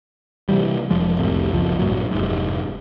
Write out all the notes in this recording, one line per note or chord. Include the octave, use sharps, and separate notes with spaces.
C3 E3 G3
F1 F3 G#3
C2 F2 A2 C3
F#1 C#2 F3
A1 G2 A#2 F#3
F1 G#2